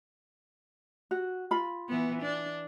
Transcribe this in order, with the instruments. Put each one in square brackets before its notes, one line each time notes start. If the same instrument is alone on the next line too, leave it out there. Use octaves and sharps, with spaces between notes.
[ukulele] F#4
F4 B5
[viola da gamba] E3 B3
D4